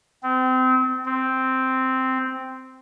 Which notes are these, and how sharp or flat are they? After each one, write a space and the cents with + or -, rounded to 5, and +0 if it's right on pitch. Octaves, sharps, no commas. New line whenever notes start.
C4 -30
C4 -5